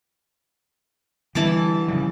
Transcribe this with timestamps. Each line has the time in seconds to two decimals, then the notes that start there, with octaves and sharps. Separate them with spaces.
1.35 D3 E3 G3 A5 D6
1.88 C#3 F3 G3